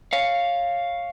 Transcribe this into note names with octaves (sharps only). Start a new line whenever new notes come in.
C#5 F5